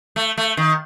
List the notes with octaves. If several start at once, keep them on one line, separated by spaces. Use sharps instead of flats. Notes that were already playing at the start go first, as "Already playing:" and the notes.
A3
A3
D#3